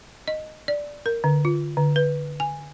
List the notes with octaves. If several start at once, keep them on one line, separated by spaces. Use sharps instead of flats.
D#5
D5
A#4
D3
F4
D3
B4
G#5